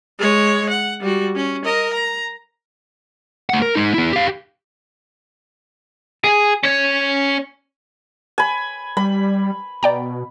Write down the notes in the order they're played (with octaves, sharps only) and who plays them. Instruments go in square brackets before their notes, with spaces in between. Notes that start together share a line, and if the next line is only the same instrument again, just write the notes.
[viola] G#3 C#5
F#5
G3 F#4
C#4
A#4 D#5
A#5
[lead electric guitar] A3 F#5
A#4
G#3 D#4
B3 E4
G4 F5
[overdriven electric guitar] G#4
C#4 C#5
[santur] G#5 B5
[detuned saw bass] G3 [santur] B5
[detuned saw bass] B2 [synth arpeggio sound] D5 G5 A#5